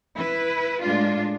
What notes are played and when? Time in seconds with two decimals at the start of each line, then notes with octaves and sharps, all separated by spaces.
0.15 E4 B4
0.82 A2 G#3 D4 F4